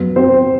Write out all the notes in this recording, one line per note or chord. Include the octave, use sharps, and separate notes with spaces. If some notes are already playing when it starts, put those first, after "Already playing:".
Already playing: F#2 F#3 B3
C4 C5